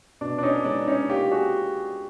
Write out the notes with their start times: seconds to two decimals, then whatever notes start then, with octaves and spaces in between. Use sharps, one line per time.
0.21 B2 D4
0.38 D4
0.43 C#4 D#4
0.65 G#3 D4
0.87 C#4 D#4
1.09 A#3 F4 G4
1.31 F#4 G#4